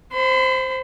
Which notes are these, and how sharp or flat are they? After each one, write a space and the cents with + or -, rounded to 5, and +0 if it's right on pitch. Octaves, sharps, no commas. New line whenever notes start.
C5 +0 B5 +45